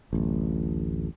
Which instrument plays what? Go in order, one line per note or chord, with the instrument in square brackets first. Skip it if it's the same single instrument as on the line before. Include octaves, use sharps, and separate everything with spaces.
[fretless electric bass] D1 A1